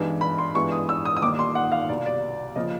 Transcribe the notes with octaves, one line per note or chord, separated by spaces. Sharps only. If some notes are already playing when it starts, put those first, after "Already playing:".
Already playing: G2 E3 G#3 B3 D#4
B5
C6
G2 E3 G#3 B3 E4 C#6
D#6
E6
D#6
D#6
D#2 D#3 G3 A#3 D#4 D6
C6
F#5
F5
C2 B2 G3 D5
D5
C#3 F3 A#3 D#5